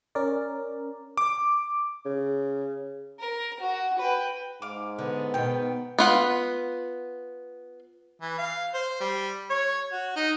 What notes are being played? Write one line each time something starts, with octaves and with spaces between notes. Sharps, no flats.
C#4 A#4 D5
D6
C#3
A#4
F#4
B4 G5
G#2 F5 D6
D3 B3
B2 D#3 G5
B3 F4 F#5
E3
F5
C5
G3
C#5
F#4
D#4